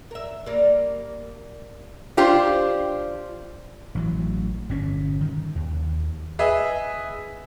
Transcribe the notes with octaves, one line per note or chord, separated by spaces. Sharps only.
A#4 E5
G3 A#3
D4 F4 G4 C5
A1 E3 F#3
G1 A#2 C#4
D#3
D#2
G#4 B4 D#5 E5